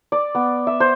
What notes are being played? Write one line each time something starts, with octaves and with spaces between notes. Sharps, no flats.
D5
B3
E5
C5